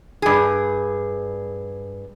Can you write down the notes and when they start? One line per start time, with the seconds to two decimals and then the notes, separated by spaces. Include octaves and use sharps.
0.22 G2 G#4